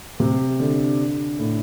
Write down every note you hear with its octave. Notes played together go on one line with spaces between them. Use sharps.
C3
D3
A2